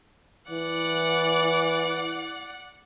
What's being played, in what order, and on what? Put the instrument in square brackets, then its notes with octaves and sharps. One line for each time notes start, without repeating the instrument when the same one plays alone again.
[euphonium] E3 [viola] D5 F#5